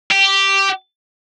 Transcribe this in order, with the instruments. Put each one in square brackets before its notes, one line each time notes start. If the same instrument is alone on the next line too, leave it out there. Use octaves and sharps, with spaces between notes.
[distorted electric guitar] G4